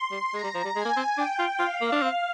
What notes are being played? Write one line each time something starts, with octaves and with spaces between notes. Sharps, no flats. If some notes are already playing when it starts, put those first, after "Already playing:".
Already playing: C6
G3
G#3 A#5
G3
F3
G3
G#3 G#5
A#3
C4
D4 G5
F4
F4 F5
A#3
D4
C4